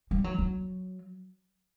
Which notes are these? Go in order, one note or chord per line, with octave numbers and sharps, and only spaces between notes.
G3
F#3
F#3